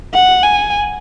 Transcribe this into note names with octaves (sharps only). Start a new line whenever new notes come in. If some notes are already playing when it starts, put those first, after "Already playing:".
F#5
G#5